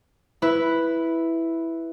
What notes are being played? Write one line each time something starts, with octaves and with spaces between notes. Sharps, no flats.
E4 B4